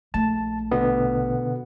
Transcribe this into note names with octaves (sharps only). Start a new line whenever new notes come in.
A#1 A3 A5
B2 D3 B3